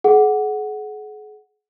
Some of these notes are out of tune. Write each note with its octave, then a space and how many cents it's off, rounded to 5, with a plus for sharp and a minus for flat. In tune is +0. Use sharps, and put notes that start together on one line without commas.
G#4 +40 F#5 +0